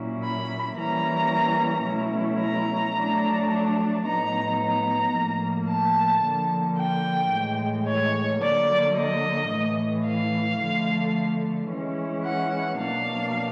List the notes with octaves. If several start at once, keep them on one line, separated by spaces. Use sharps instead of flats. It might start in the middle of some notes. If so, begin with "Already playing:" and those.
Already playing: A#2 F#3 A#3 C#4 E4
B5
E3 G3 A#3 C#4 E4 A#5
B2 F#3 A3 C#4 E4
A#5
F#3 A3 D4
A2 F#3 B3 D#4 A#5
A#5
A2 F3 A#3
A5
D3 F3 A#3
G5
A2 E3 G#3
C#5
D3 F#3 A#3 D5
D#5
A2 E3 A3
F5
D3 F3 A3
E3 G#3 C#4 E4
F#5
B2 F#3 A#3 D4 F5